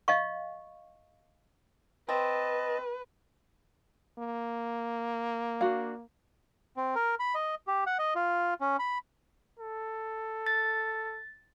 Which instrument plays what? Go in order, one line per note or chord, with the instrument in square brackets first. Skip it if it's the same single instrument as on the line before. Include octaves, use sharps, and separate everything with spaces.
[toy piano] D#5 F5 C#6
[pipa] C4 [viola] B4 [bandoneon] D#5 A5
[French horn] A#3
[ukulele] D4 F#4 F5
[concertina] C4
A#4
B5
D#5
G4
F#5
D#5
F4
C#4
B5
[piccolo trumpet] A4
[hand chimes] A6